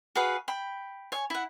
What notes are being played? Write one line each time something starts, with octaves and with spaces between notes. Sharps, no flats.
F#4 G#4 B4 F5
G5 B5
C#5 G#5
E4 F#5